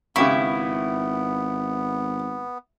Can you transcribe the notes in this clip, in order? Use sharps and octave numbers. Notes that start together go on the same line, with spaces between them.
G#1 C#3 B3 E4 G4 C#6